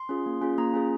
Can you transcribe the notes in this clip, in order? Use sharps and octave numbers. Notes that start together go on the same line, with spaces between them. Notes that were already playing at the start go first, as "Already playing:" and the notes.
Already playing: C6
C#4 F4 G#4
A#3
C#4 F4 G#4
A#3 A#5
C#4 F4 G#4